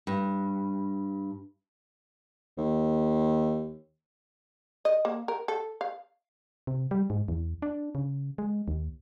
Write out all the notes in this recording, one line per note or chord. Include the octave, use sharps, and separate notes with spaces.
G2
D#2
D#5
A#3
A#4
A4
F5
C3
G3
G#2
E2
D4
C#3
G#3
D#2